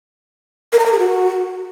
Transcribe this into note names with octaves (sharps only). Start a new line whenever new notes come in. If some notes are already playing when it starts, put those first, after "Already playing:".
A#4
A#5
A#4
G#4
F#4